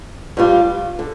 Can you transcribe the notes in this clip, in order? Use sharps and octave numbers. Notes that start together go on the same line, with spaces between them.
G2 G3 F4
D3